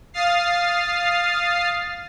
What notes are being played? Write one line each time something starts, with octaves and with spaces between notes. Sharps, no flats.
F5 D#6 F6 A6 C7